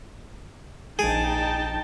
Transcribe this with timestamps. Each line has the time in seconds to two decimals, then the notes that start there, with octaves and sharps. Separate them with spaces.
0.99 A#1 D#4 G#4 G5 A5 D7